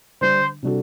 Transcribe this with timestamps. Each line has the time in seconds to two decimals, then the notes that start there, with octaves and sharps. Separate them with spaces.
0.21 D3 G3 D4 C5
0.63 C3 G3 D4 F#4 A4